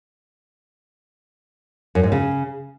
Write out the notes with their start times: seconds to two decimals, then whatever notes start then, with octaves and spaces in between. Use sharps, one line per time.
1.95 F#2
2.03 G#2
2.12 C#3